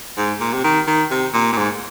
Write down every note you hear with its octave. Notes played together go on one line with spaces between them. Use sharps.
G#2
A#2
C3
D#3
D#3
C3
A#2
A#2
G#2